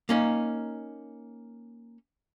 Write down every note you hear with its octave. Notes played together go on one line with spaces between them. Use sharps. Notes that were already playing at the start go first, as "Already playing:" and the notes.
A#3 C#4 D#4